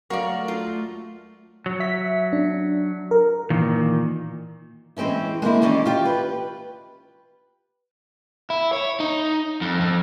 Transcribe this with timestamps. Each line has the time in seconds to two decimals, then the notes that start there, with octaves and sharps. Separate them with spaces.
0.10 F#3 A3 F#4 A#4 D5 F5 C#6
0.48 F4
1.66 F#3
1.80 E5 B6
2.33 D4
3.11 A#4
3.50 A#2 D#3 E3
4.97 E3 G#3 C4 C#4 E4
5.42 G#3 A#3 C4 E4
5.62 D#3 E3 G#3 C#4 D5
5.86 F4 G4
6.05 B4
8.50 E4
8.73 C#5
9.00 D#4
9.61 F2
9.80 F2